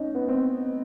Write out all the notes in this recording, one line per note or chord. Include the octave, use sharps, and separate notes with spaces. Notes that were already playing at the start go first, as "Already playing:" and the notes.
Already playing: C#4 D#4
B3
C4